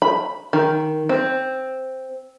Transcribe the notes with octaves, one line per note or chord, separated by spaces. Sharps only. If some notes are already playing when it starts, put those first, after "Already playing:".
B5
D#3
C4